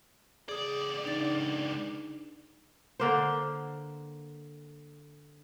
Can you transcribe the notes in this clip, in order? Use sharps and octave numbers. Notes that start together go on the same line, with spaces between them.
C#2 G#4 D5 D#6
D4 D#4 A6
D3 A#3 C5